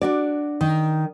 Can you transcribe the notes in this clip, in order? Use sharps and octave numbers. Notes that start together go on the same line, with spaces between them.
D4 F#4 D5
D#3